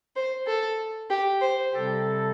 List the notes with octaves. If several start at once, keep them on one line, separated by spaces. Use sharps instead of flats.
C5
A4
G4
C5
C3 G3 C4 G4 A4